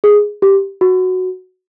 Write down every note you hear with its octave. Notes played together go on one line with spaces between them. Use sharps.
G#4
G4
F#4